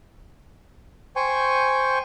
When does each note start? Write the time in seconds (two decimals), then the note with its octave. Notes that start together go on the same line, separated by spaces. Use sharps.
1.16 C5 G5 G#5 C#6